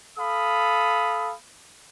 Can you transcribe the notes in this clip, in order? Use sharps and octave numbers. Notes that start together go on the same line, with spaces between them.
A4 F5 B5 D#6